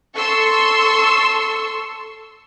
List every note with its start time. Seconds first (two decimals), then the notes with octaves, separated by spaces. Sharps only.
0.16 A4 C6 C#6 E6